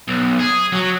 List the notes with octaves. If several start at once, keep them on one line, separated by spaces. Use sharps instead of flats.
B1
G#4
F#3